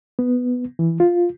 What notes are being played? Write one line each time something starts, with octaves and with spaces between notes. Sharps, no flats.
B3
E3
F4